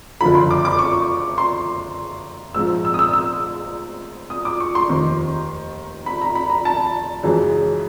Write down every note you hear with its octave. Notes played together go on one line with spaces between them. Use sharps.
F#1 F2 D3 F3 B5
C6
D6
D6
C#6
C6
A#1 G#2 F3 E6
E6
D#6
E6
E6
D#6
D6
C#6
C6
F1 D#2 D#3
B5
A#5
B5
A#5
A5
F#2 C#3 E3 G#3